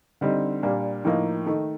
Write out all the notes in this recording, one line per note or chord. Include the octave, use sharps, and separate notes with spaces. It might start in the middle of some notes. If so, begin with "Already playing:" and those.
D3 G3 C4 D#4
A#2 G3 A#3 D4
A2 F3 A#3 D#4
D#3 A3 D#4